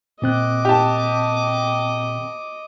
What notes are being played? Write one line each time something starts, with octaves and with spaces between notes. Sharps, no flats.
A#2 C4 D#5 D6 F#6
G4 A5